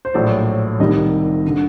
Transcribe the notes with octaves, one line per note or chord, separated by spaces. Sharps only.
C5
A#1 A2 F#3 D5
C2 C3 D#3 G3 D#5
D3